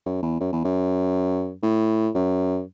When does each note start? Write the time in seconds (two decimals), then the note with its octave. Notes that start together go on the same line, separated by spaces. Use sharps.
0.06 F#2
0.23 E2
0.40 F#2
0.52 E2
0.64 F#2
1.63 A2
2.15 F#2